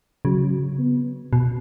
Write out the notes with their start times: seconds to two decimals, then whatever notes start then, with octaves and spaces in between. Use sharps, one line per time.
0.25 C#3 F#3
0.79 B3
1.33 B2